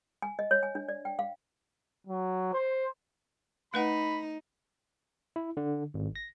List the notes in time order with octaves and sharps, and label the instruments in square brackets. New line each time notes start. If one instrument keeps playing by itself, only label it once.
[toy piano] G#5
D#5
C#5
G#5
D4
D5
G5
F5
[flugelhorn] F#3
C5
[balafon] A3 B4 F#5 [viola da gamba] D#4 [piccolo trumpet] B5
[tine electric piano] E4
D3
G#1
A#6